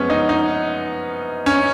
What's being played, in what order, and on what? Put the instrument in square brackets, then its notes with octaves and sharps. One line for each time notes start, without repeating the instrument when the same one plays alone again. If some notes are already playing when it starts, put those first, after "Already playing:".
Already playing: [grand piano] F#2 F3 G#3 B3 C#4
D#4
D#4
C#4